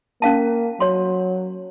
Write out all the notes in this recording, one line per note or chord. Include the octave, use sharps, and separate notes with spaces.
A#3 C#4 F5 A5
F#3 C#5 C6